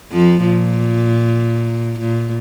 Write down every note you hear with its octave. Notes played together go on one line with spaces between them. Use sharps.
F2 F3
A#2
A#2